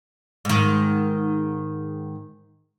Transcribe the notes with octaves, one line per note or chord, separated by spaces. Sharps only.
G#2 D#3